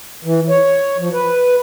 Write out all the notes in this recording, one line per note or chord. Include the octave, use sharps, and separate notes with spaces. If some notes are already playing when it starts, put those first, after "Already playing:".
E3
C#5
F3
B4